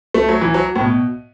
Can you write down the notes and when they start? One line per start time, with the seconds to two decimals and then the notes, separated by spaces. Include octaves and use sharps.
0.14 A3
0.29 F#3
0.41 E3
0.54 F#3
0.76 A2
0.81 B2